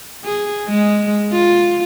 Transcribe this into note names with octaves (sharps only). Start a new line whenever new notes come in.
G#4
G#3
F4